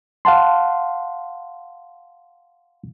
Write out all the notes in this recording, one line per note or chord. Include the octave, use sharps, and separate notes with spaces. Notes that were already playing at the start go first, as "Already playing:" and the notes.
F5 F#5 A5 C6